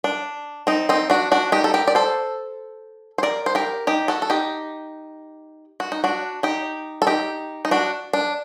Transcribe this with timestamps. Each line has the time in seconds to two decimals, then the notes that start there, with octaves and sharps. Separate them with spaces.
0.04 D4
0.67 C4 D#4
0.89 C4 D#4
1.10 D4 F#4
1.32 D4 F#4
1.52 D#4 G4
1.64 A4
1.74 G4 A#4
1.87 D5
1.95 A4 C5
3.18 C5
3.23 A#4 D5
3.46 C5
3.55 G4 A#4
3.87 D#4 G4
4.08 F#4 A4
4.22 A4
4.30 D#4 G4
5.80 F#4
5.92 D#4
6.04 D4 F#4
6.43 D#4 G4
7.02 A4
7.07 D#4 G4
7.65 D#4
7.71 D4 F#4
8.13 D4